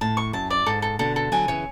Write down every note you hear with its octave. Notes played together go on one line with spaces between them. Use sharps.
A2 A5
C#6
F#2 A5
D5
G#2 A4
A4
B2 D3 A4
A4
D3 F#3 G#5
C#3 E3 C#5